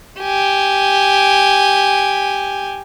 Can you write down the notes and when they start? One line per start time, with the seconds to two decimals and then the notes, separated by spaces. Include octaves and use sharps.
0.21 G4 G#5